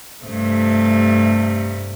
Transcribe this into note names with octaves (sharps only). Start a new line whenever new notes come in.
G2 C3 A3